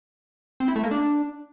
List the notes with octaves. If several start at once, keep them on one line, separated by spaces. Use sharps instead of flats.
C4
E4
A3
A#3
D4